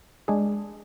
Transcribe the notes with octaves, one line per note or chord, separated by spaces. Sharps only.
G#3 D4 G#4